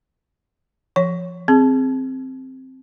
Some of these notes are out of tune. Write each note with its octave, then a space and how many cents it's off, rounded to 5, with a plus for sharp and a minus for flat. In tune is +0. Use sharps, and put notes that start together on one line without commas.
F3 -15 C#5 +0
C4 +0 G#4 +0